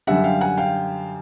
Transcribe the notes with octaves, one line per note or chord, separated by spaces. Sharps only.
F#2 D3 G3 E5 F#5
F5 G5
F#5 G#5
F5 G5